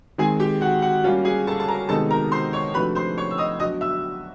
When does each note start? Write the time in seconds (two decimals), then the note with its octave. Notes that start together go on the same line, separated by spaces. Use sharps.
0.18 D#3 G#3 C4 G#4 G#5
0.40 G4 G5
0.61 F#4 F#5
0.82 F#4 F#5
1.04 G3 A#3 C#4 F4 F#4 F5
1.25 G#4 G#5
1.47 A4 A5
1.60 A5
1.68 A#4 A#5
1.89 C3 D#3 G#3 B3 D#4 A4 A5
2.11 A#4 A#5
2.32 C5 C6
2.53 C#5 C#6
2.74 C3 F3 A3 D4 F#4 B4 B5
2.95 C5 C6
3.18 C#5 C#6
3.31 E6
3.38 D#5 D#6
3.60 F#3 B3 D4 F#4 D#5 D#6
3.81 E5 E6